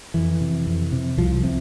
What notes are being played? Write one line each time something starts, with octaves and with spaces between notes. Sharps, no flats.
F2 E3
C3
F2
C3
C2 F3
C3